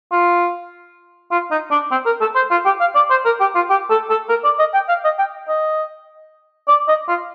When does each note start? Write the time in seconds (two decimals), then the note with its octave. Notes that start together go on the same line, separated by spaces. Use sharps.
0.12 F4
1.31 F4
1.51 D#4
1.71 D4
1.91 C4
2.06 A#4
2.21 A4
2.35 C5
2.51 F4
2.65 G4
2.80 F5
2.95 D5
3.10 C5
3.25 A#4
3.40 G4
3.55 F4
3.70 G4
3.90 A4
4.10 A4
4.29 A#4
4.44 D5
4.59 D#5
4.74 G5
4.88 F5
5.04 D#5
5.19 G5
5.48 D#5
6.68 D5
6.88 D#5
7.08 F4